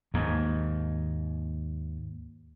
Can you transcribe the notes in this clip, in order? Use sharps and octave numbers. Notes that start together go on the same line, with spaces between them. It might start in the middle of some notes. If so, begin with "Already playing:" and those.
D#2 G#2